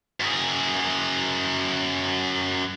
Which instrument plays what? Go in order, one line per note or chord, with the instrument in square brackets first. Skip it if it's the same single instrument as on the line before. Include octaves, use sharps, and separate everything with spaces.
[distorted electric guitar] F#2 G#4